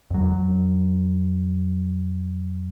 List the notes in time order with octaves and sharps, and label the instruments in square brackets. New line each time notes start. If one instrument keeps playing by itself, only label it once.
[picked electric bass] F2 F#3